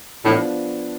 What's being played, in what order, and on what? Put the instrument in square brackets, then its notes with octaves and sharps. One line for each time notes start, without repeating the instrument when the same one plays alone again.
[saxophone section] A2 [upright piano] F3 B3 D4